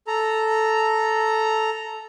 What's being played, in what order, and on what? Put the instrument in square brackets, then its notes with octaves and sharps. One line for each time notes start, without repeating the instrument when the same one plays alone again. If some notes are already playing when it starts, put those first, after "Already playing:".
[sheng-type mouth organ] A4 A#5